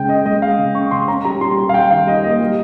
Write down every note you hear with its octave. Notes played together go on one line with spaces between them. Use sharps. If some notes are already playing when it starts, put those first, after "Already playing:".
Already playing: C#3 G#3 G5
C#4 D#5
G#3 D#5
G#3 F5
C#3
C#4 C#6
C#3 C6
C#4 A#5
G3 A#5
G3 C6
G3 C6
F5
G3 G5
D#3 F5
G3 D#5
A#3 D#5
G3